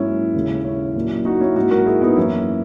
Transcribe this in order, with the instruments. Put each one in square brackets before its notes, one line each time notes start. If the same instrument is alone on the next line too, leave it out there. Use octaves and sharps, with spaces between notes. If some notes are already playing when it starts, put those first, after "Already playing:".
Already playing: [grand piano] G#2 F#3 A#3 C#4 E4
D#2 C#3 G#3
C#4 E4
A#2 F#3 A#3
D#4 F#4
C#4 E4
G#2 F#3 A#3 D#4 F#4
F#4 A#4
E4 G#4
B3 D#4
F#2 E3 A#3 C#4 E4